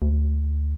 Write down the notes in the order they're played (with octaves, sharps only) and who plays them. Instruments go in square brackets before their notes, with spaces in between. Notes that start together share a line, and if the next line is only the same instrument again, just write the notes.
[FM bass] D2